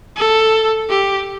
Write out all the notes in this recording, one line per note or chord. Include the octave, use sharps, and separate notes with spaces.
A4
G4